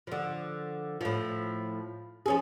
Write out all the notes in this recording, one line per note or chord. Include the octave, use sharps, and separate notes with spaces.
D3 F3
A2 F3
F3 C#4 G#4